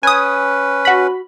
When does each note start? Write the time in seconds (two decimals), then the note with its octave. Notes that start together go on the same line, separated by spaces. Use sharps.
0.03 C#4 B4 G#5 D#6
0.85 F#4 B5